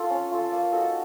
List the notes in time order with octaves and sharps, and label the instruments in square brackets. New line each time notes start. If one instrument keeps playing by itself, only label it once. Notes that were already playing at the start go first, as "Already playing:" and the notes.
Already playing: [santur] F4 A4
C#4
F4 A4
A#3
D#4 F#4 A4